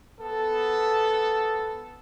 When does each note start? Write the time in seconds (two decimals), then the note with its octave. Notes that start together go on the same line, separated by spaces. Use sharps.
0.19 B3 A4